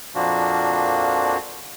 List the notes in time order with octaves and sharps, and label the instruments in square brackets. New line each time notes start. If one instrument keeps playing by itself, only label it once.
[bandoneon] F2 A#2 F3 A#3 D4 F#4